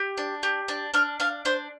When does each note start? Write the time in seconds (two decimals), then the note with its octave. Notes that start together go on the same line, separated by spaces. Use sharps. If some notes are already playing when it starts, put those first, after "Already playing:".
Already playing: G4
0.17 D4
0.43 G4
0.68 D4
0.94 D4 F6
1.20 D4 F5
1.45 D4 C5